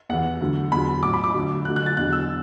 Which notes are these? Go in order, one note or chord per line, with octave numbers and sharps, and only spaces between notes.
E2 E3 F#5
D2 D3 F#3
E2 D3 F#3 B5
A2 F#3 D6
B5
D6
D2 D3 F#3
D2 D3 F#3 F#6
F#6
A6
E2 D3 F#3 F#6
E6